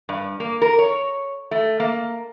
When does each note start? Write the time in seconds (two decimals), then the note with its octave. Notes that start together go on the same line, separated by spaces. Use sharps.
0.09 G2
0.40 A#3
0.61 A#4
0.79 C#5
1.51 A3
1.80 A#3